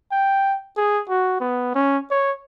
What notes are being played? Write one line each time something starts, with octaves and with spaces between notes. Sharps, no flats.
G5
G#4
F#4
B3
C#4
C#5